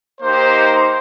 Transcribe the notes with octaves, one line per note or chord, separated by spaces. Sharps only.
A#3 D#4 G4 C5